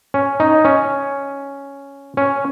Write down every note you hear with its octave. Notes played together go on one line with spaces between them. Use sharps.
C#4
D#4
C#4
C#4